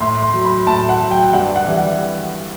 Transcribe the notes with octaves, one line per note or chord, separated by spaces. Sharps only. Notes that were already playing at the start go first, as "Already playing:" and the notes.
A2 C6
C6
F#3
B5
A2 A5
F#5
F#3
G5
G2 F#5
F#5
E3 G3
F#5